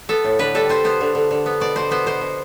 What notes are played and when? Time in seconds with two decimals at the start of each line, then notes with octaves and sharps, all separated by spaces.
0.09 B3 A4
0.24 A2
0.39 D3 B4
0.55 G3 A4
0.69 G3 C5
0.84 B3 C5
1.01 D3
1.15 D3
1.31 D3
1.46 B3
1.60 B2 D5
1.76 B2 C5
1.91 B3 C5
2.06 B2 C5
2.21 B2